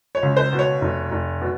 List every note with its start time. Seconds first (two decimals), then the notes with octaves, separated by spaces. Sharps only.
0.15 C#5
0.23 C#2
0.37 C5
0.53 B2
0.59 C#5
0.81 F1
1.11 F1
1.41 B2